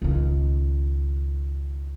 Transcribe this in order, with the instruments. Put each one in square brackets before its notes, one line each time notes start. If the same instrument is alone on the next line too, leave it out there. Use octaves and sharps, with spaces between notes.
[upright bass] C#2 D#3